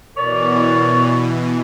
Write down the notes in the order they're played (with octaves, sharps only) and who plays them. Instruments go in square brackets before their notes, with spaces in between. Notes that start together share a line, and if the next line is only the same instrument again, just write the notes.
[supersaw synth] B2 E3 [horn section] A#4 C#5 D5